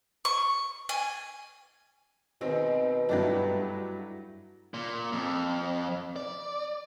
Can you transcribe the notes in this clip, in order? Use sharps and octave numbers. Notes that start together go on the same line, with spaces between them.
C#6
G#5
B2 D#3 G#3 C4
G2 F#3 G3 A3 D4 E4
A#2
F2
D5